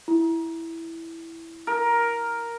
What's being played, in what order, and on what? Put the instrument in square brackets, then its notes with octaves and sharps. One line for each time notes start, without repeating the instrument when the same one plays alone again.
[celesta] E4
[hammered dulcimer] A#4